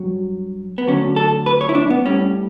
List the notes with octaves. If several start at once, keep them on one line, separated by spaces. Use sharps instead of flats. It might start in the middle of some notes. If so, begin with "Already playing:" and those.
Already playing: G2 F#3
B3
D2 D3 F#3 C#4
A4
B4
C#5
E4
D4
B3
A2 G3 C#4